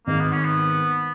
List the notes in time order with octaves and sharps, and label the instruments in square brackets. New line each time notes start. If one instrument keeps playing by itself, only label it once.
[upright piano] G#1 G#2 D#3 G#3 D#4 [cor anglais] A#3
[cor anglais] B3
C#4
B3